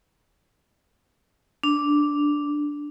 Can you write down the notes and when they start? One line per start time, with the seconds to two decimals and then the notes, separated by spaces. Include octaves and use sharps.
1.64 D4